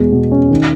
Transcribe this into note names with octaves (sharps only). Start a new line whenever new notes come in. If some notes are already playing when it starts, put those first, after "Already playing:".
Already playing: E2 B2 G#3
B2
C#4
D#3